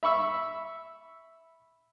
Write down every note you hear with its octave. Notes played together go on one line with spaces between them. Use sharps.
E5 B5 C#6 E6